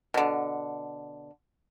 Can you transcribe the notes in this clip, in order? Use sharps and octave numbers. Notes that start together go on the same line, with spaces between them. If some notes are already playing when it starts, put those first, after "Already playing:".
B2 D3